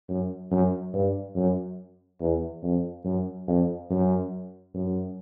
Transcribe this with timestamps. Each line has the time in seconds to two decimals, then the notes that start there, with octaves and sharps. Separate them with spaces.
0.08 F#2
0.51 F#2
0.93 G2
1.36 F#2
2.20 E2
2.63 F2
3.05 F#2
3.47 F2
3.90 F#2
4.74 F#2